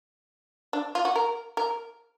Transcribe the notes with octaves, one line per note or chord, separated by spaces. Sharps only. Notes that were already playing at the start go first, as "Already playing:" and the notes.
D4
F4
F#4
A#4
A#4